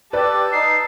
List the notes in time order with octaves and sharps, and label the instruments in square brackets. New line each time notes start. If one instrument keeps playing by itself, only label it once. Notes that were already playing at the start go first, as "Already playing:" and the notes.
[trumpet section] G4 [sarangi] A4 [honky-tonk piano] B4 D5
[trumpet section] D#4 [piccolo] C7